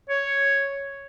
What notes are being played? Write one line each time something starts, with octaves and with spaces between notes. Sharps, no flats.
C#5